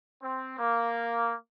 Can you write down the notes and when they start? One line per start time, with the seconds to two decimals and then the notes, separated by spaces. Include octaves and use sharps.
0.22 C4
0.59 A#3